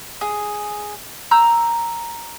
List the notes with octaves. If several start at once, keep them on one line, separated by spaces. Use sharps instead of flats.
G#4
A#5 E6 G6